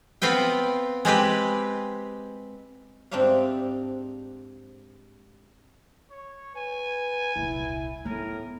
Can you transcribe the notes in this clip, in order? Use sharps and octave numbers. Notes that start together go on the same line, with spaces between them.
B3 C4 F4 B4 G5
G#3 C4 G4 B4
G#2 C4 D4 G4 E5 F5
C#5
B4 G#5
D#1 C2 E4
A2 B3 A#4